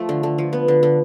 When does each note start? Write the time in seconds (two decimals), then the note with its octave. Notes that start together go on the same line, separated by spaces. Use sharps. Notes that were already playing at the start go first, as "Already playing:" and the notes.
Already playing: F3 A3
0.09 D3
0.23 D3
0.38 F3
0.53 B3
0.68 D3
0.83 D3